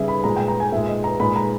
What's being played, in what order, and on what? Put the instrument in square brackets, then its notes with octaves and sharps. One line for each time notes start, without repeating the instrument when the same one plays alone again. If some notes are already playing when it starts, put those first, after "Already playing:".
Already playing: [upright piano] C#3 G3 G#4 E5
B5
A#2 G#3 A#5
G5
A#5
G#5
A#2 G#3 E5
D#5
A#5
A#2 G#3 B5
A#5